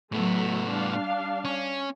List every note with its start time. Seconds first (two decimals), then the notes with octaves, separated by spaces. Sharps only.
0.12 A2 F#3 A3 B3
0.67 G3 D4 F5
1.45 C#4